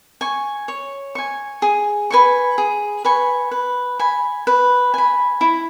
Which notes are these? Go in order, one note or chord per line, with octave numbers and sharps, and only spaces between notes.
G#5 C#6
C#5
G#5 C#6
G#4
B4 G#5 C#6
G#4
B4 G#5 C#6
B4
G#5 B5
B4
G#5 B5
E4